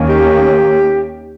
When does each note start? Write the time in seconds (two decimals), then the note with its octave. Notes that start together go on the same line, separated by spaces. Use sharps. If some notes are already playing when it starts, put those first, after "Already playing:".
Already playing: D#2 D#3 A#3 C#4
0.09 G4